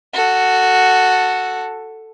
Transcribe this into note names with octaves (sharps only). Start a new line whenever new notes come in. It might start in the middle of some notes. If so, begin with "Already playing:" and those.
F#4 A4